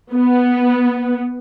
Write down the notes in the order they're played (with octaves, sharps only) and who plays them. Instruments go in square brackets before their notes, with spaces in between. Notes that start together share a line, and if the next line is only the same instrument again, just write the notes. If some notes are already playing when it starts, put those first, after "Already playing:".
[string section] B3